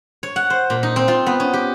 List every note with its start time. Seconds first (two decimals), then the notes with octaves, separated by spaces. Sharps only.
0.23 C#5
0.36 F#5
0.50 C5
0.70 A#2
0.83 D#4
0.96 C4
1.08 F4
1.26 B3
1.40 C#4
1.54 G4